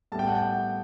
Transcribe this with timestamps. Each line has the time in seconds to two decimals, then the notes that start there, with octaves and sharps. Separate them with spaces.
0.12 A2 G3 B3 A5
0.19 G5
0.28 F#5
0.35 G5